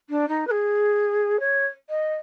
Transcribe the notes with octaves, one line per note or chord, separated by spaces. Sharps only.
D4
D#4
B4
G#4
C#5
D#5